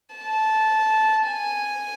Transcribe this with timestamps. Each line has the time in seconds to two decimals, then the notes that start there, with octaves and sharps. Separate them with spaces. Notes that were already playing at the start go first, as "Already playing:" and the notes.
0.16 A5
1.28 G#5